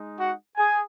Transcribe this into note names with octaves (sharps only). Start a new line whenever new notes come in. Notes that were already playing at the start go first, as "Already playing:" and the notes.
Already playing: G#3 D#4
F#4 F#5
G#4 G#5